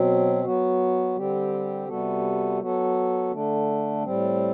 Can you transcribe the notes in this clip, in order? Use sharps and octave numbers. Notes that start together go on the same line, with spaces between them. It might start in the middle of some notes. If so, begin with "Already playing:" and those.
Already playing: B2 F#3 C4
F#3 B3 F#4
D3 G3 C4 G4
C3 G3 B3 F#4 A4
F#3 B3 F#4 A4
D3 A3 D4
A2 G3 C4